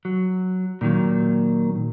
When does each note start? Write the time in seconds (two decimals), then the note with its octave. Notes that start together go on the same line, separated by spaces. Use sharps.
0.05 F#3
0.81 A#2 D#3 F#3 A#3